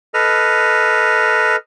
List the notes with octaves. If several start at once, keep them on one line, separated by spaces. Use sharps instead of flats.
A4 B4 D#5 F6